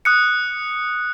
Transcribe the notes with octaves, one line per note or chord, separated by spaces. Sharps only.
D#6 F#6 C#7